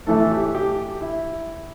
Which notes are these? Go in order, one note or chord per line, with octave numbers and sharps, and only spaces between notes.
A2 E3 A3 A4
G4
G4
E4